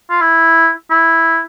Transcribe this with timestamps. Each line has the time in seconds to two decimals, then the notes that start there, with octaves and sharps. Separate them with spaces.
0.10 F4
0.21 E4
0.91 E4